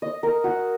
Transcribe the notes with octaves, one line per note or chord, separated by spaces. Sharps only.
D#5
A#4
F#4